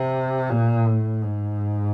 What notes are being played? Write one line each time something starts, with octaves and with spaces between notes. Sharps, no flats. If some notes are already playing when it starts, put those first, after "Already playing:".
Already playing: C3
A#2
A2
G#2